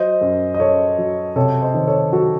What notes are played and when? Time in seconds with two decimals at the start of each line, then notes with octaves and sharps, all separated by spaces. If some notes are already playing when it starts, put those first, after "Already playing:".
Already playing: F#3 C5 D#5
0.21 F#2
0.54 D#5
0.60 F#2 A4 C#5
0.98 F#3
1.36 C3 A4 C#5
1.62 C5 D#5
1.74 D#3
1.87 A4 C#5
2.12 F#3 F#4 A4